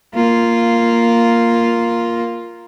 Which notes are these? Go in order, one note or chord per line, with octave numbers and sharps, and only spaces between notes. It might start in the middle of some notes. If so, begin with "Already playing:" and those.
A#3 F4